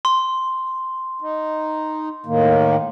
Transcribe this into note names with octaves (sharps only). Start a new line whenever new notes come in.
C6
D#4
A2 D#3 A#3